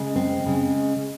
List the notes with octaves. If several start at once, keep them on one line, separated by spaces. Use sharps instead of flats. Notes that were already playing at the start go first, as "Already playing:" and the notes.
Already playing: C#3 G#3
C4
C#3 G#3